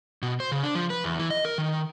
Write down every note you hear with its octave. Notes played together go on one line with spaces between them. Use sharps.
B2
C5
C#3
D4
F3
B4
E2
E3
D#5
A#4
D#3